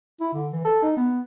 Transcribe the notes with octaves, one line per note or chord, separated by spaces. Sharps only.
E4
D3
E3
A4
D#4
B3